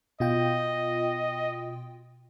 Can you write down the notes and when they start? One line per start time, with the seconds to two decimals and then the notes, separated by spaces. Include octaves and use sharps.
0.20 B2 F4 D#5 G5